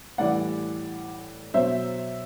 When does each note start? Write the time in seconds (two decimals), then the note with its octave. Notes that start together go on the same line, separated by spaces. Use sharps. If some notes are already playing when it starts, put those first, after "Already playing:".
0.18 A2 E3 G3 D5 F#5
1.54 B2 F#3 C5 E5